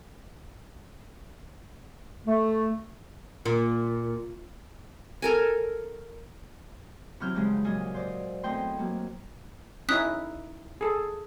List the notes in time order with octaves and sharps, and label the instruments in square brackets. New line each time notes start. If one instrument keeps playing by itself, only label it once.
[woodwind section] A3
[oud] A#2
[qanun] A4 A#4 G#5
[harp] C3 E3 F#3 C4 F6 G6
G2 C#3 E3 F3 G#3
A#2 F#3 F4 D#5 G#5
C5 D5 D#5
E2 A3 C4 D#5 G5 C6
F#3 A#3
[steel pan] C#4 D#4 E4 [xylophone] D#6 F#6 B6
[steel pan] G#4 A4